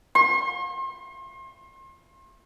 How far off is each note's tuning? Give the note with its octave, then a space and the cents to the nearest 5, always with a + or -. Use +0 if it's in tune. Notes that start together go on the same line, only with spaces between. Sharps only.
C6 +35